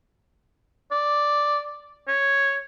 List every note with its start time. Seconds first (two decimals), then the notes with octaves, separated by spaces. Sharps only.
0.92 D5
2.08 C#5